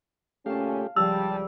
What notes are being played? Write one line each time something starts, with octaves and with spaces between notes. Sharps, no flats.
A#2 C#3 A3 C#4 G4 F5 A5
C#2 F3 G3 C4 A5 E6